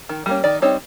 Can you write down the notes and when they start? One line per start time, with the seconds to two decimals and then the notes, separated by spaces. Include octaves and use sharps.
0.09 D#3
0.26 G3 A#3 C#4
0.44 D#3 D5
0.62 G3 C4 D#4 C#5